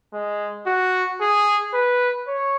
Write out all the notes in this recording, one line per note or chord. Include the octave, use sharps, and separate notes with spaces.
G#3
F#4
G#4
B4
C#5